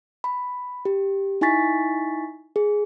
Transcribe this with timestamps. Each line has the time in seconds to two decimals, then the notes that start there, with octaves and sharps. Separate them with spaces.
0.24 B5
0.85 G4
1.41 D#4 E4 G#5 C#6 A6 B6
2.56 G#4